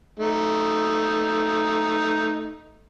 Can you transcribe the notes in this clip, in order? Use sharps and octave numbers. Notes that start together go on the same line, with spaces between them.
A3 D#4